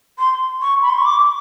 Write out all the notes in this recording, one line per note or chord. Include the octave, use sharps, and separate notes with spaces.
C6
C#6
B5
C6
C#6
D6